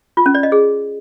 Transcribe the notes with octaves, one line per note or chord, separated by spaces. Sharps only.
F4
C#4
D5
D#5
G#4